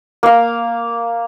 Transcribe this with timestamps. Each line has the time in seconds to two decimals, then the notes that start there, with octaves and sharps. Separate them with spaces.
0.23 A#3 F5